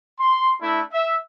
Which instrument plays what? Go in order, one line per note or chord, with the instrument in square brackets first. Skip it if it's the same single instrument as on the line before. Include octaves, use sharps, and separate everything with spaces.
[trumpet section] C6
A3 D4 E4
E5